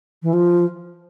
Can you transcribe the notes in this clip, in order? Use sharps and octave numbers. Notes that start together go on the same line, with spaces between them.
E3
F3